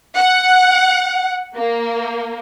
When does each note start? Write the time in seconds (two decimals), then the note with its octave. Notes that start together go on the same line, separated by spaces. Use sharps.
0.16 F#5
1.55 A#3